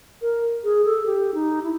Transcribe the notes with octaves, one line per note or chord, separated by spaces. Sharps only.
A#4
G#4
A4
G4
D#4
E4